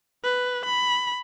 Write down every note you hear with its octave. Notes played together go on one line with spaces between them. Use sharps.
B4
B5